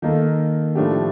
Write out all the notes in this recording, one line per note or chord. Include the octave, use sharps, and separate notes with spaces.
D#3 A#3 D#4 A4
A2 F3 A3 D4 G4